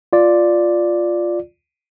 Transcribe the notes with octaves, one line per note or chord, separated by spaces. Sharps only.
F4 D5